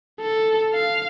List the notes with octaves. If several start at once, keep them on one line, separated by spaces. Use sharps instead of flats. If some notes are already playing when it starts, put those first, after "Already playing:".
A4
F5